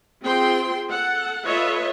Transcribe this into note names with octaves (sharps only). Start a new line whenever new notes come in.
C4 F4 G#4 G5 C6
A4 F#5
F4 A4 B4 C#5 D#5 E5